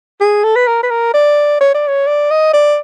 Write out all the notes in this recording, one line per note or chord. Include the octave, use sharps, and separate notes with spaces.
G#4
A4
B4
A#4
B4
A#4
D5
C#5
D5
C#5
D5
D#5
D5